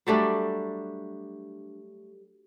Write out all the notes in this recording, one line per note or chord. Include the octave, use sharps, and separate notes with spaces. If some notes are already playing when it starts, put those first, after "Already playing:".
F#3 G3 A3 D4